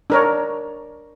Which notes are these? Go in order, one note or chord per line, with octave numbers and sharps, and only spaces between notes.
D4 A#4 C#5